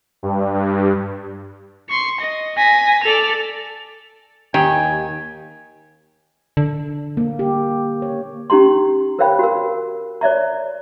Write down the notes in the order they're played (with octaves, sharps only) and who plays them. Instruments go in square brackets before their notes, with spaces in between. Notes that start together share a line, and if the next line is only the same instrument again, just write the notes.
[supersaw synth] G2
G2
[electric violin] C6 C#6
D#5
[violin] G#5 [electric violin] A#6 B6
[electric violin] A4 D5 [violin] F7
[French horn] D#2 [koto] D#3 [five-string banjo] G4 [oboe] G#5
[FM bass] D3
[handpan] A#3
G4
C#5
[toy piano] C#4 D#4 G4 A#5 C6
A#4 C5 C#5 F5 G5 B5
F#4 A#4
C#5 D5 E5 A#5